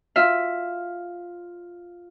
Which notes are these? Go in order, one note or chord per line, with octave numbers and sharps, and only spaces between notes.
F4 E5 F5